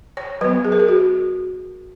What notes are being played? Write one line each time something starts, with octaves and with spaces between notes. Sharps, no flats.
C#5
F#3 B3 B4
G#4
A#4
G#4
F#4